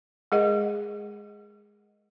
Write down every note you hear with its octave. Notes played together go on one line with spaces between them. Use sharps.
G#3 G#4 A#4 D#5 F#5